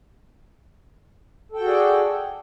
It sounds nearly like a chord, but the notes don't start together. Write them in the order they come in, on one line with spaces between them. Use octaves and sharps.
A4 G5 F#4 G#4 D5